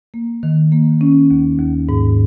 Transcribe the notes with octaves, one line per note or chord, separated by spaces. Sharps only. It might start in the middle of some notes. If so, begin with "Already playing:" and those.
A#3
D#3
A#3
C#4
D#2
D#2
G#2